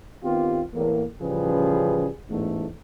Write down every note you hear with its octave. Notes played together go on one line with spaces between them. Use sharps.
D#3 B3 C4 F4 G4
E2 A2 A#3
A1 C#3 F3 G3 G#4 B4
A1 E2 G#2 A3